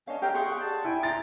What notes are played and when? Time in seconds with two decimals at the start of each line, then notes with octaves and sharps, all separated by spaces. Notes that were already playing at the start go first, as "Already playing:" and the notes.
0.07 C#4 D4 C#5 D#5 F5
0.22 G4 E5 F5 G5 A#5
0.34 G4 G#4 F#5 C6 C#6
0.61 D5 A5
0.84 E4 G5 G#5
1.03 A#5 C6 A6